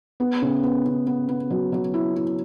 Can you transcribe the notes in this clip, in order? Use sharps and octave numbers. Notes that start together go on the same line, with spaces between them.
B3
C#3
B3
C#3
B3
B3
F#3
F#3
E4
E4